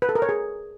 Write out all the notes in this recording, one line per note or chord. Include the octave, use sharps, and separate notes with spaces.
B4
A4
A#4
C#5
G#4